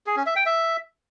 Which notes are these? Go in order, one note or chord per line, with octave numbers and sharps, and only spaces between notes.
G#4
C#4
E5
G5
E5